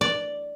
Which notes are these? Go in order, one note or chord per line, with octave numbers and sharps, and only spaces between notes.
D5